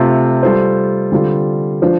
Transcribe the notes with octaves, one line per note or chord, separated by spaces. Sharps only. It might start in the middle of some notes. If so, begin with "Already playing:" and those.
Already playing: C3 A3 F4 C5
G3 F4 A4 C5
D3 G3 C4 F4 A4
F3 D4 F4 C5